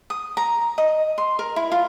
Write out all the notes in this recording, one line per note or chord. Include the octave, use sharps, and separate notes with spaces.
D#6
A#5
D#5
C6
A#4
E4
F4